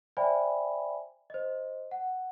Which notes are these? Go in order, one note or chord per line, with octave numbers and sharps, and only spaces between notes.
C5 D5 E5 G5 G#5 B5
C5 D#5
F#5